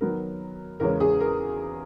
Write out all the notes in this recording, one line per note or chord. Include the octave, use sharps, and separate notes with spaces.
D#3 F#3 B3 A#4
E2 C#3 G#3 C#4 A#4
G#4
A#4